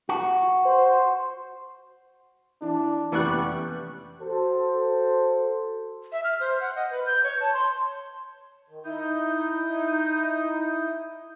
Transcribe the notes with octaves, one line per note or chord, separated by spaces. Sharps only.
F#4
C5
E3 D4
F1 E3 G3 B3 C#4 C#6 F#6
F#4 A4 C5
E5
F6
C5
F#5
D#5
B4
G6
C#5
A5
C6
D#3
D#4 E4 D#6 G6
D#4